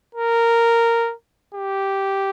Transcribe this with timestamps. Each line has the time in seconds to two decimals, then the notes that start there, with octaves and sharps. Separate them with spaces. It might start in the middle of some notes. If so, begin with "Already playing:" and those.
0.15 A#4
1.54 G4